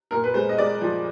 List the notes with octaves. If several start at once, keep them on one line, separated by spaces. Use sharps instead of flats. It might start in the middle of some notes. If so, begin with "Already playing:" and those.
A#2 A#4
B4
G#3 C5
D#5
G#3 D5
F3